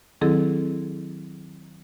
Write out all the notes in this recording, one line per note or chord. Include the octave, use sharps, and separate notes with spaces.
D#3 F#3 C4 E4 G#4 A4